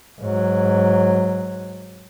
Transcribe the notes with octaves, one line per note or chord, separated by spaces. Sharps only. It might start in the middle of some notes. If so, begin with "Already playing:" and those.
G#2 F#3